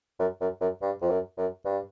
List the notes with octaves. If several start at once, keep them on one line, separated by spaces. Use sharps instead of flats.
F#2
F#2
F#2
G2
F2
F#2
F#2
G2